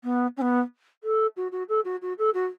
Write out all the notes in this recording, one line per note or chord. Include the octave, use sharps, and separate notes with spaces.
B3
C#4
B3
A4
F#4
F#4
A4
F#4
F#4
A4
F#4